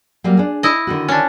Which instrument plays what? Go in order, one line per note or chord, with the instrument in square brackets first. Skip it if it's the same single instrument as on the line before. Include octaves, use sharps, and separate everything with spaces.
[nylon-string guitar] F#3 G3 A#3
D4 G#4
[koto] E4 D#5
[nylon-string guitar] D3 D#3 F#4
[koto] C#4 D4